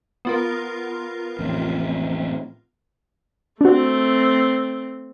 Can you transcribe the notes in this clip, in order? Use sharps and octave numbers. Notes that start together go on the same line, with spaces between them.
B3 F4 A#4
A1 F2
A3 C4 D4 F#4